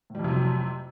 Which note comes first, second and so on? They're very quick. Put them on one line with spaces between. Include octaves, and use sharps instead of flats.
A2 G3 F2 C3 F#3